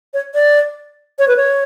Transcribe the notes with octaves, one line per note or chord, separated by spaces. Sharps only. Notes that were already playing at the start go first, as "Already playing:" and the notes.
C#5
D5
C#5
B4
C#5